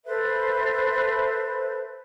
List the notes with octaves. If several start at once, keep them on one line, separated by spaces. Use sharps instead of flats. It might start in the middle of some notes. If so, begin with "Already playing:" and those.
A4 B4 C5 E5